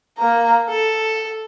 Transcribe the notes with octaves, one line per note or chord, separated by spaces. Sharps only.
A#3 A#5
A4